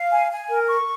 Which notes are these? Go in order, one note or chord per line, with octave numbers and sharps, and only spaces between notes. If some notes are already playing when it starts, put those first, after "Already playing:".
Already playing: F5
G#5
G#5
A#4
C#6